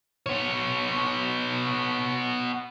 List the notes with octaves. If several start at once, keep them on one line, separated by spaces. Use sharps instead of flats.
B3 C#5